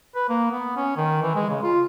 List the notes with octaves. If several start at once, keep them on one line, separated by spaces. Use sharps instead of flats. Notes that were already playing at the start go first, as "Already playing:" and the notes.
B4
A#3
B3
C#4
D#3
E3
G#3
C#3
F4